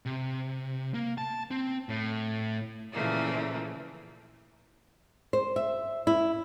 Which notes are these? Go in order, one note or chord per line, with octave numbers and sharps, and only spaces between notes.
C3
A#3
A5
C4
A2
A#2 C#3 E3 F3 A3 A#3
C5
E5
E4